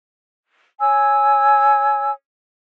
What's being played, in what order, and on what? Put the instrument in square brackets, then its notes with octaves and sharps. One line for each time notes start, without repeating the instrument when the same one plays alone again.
[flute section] C#5 G#5 E6